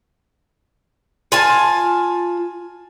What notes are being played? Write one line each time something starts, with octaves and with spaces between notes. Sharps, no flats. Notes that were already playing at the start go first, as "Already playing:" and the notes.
F4 G#5 A5